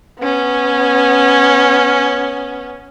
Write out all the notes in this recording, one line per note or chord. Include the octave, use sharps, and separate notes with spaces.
B3 C#4